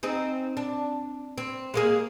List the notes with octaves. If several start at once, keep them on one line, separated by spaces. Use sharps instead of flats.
C4 D#4 G#4
D4
C4
G#3 A#3 G#4